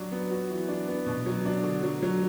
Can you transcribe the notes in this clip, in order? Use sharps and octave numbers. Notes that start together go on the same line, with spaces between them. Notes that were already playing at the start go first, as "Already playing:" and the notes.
Already playing: F#3 D4
B3
F#4
E3
D4
B3
B2
F#3
D4
D3
F#3
F#3